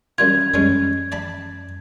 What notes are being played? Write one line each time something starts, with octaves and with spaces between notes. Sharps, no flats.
F#2 G3 F4 G#6
F#2 G3 G#3 C#4
D5 A5 B5